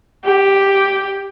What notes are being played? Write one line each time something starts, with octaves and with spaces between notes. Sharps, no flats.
G4